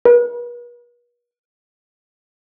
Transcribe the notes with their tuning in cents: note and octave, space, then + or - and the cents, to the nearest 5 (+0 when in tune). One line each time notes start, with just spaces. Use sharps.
B4 -45